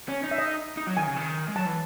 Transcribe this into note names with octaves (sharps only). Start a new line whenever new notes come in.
C#4
D#4
E5
D#5
D#4
F#3
D#3 G#5
C#3
D#3
G#3
F#3 A5
E3